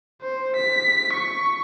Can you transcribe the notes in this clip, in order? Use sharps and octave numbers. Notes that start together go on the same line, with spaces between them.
C5
B6
C#6